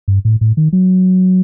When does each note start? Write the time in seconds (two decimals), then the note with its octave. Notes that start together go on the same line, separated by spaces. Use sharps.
0.08 G2
0.25 A2
0.41 A2
0.57 D#3
0.73 F#3